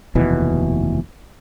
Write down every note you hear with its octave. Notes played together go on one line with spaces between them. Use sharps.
F1 D#2 B2 E3